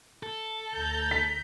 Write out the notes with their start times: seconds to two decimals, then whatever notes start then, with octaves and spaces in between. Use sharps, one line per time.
0.23 A4
0.72 D2 A#5 G6
1.11 B6